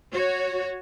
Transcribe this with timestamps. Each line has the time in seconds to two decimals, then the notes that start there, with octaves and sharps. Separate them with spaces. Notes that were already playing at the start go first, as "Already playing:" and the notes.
0.13 F#4 C#5